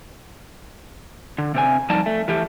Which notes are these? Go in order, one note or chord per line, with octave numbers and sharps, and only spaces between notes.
D3
C3 C4 G#5
F3 G3 D#4 D5 A5
A3
E3 A3 G4